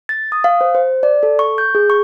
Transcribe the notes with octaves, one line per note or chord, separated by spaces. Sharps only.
A6
D#6
F5
C5
C5
D5
A4
C#6
G6
G#4
C#6